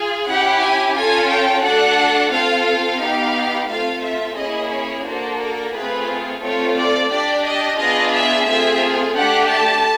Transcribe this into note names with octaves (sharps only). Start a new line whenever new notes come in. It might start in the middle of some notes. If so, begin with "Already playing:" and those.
Already playing: F4 G#4
C#4 E4 G4 F#5
G#5
C#4 F4 A4 G#5
G5
A3 D4 F#4 A4 F#5
C4 F4 A4 F5
F5
B3 D#4 G4
A3 C4 F4 F5
E5
A#3 C#4 E4 G#4 D#5
C#5
A#3 D4 F#4 A4 C5
A#4
A3 C4 F4 G#4 B4
A3 C4 F4 A4 C#5
D5
D4 G4 D5
D#5
B3 D4 F4 G#4 D#5
E5
A3 C4 F4 G#4 E5
A3 D4 G4 F#5
A5